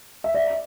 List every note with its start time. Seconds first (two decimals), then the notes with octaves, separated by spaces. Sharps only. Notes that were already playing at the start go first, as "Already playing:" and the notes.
0.24 E5
0.34 D5 E5